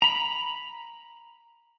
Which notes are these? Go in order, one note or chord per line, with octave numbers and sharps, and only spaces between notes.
A#5 B5